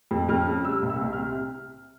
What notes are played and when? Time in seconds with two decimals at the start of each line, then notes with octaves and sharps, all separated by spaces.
0.11 F2
0.29 F2 F6
0.47 C#3
0.65 G3 E6
0.82 C2
0.90 E6
1.01 C2
1.13 F6
1.19 C3